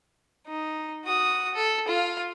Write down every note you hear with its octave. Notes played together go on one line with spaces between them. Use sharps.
D#4
F#4 D#6
A4
F4 F5